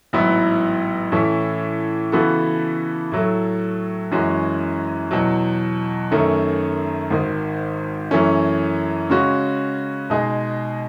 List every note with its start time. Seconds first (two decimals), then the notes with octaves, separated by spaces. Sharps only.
0.13 A1 G#2 F#3 B3 E4
1.12 A2 E3 A3 C#4 E4
2.12 C#3 E3 B3 F#4 A4
3.12 A2 F#3 A3
4.11 F#2 E3 G#3 C#4 F#4
5.11 E2 B2 F#3
6.11 F#2 D#3 A3 C#4
7.10 G#1 G#2 D#3
8.11 F#2 E3 A3 C#4
9.10 C#3 G#3 C#4 F#4
10.10 B2 G#3 D#4 G#4